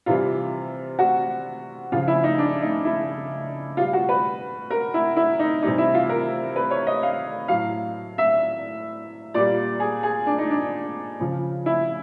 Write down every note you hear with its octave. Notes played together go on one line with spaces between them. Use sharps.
C3 E3 G3 F4
F#4
C#3 F3 F4
E4
D#4
D4
D#4
E4
B2 G3 F4
F#4
B4
A#4
E4
E4
D#4
C3 E3 G3 D#4
E4
F4
A#4
B4
C#5
D#5
F5
A2 F#3 F5
E5
A#2 G3 D5
G#4
G#4
D4
D#4
D4
C#3 F3
E4